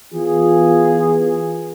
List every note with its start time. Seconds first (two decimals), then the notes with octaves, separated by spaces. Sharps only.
0.12 E3 B3 F4 G#4